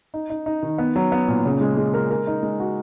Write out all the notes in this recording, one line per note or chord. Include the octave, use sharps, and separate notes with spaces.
D#4
D#4
D#4
D#3
B3
F#3
B3
A#2
C#3
G#3
G#3
A#4
A#4
D#4
G#3
F#4